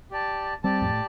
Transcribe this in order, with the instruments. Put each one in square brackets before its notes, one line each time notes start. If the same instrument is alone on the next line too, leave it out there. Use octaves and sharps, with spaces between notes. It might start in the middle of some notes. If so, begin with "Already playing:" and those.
[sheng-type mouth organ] G4 D5 A5
[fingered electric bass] G3 C4 [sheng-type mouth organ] G4 D5 A5
[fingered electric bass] F2 A2